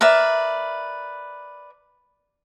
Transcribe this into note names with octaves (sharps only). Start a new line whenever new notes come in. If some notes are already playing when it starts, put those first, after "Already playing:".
A#4 B4 D5 E5